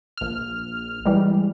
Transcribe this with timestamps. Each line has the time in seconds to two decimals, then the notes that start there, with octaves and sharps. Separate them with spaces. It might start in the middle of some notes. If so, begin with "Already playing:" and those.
0.17 A#1 F6
1.06 E3 G3 G#3